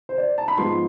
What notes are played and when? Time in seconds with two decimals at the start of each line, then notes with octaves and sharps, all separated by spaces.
0.09 C5
0.18 D5
0.38 A5
0.48 B5
0.57 G#2 F3 B3 C6